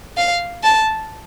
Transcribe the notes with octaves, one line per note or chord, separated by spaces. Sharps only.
F5
A5